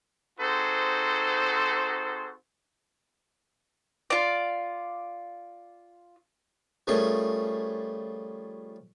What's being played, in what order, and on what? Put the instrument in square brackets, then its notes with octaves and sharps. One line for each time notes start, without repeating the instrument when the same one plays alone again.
[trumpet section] C4 D#4 F#4 G#4 A4 C5
[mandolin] F4 D5
[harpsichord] F3 G3 A3 C#4 G#4 A#4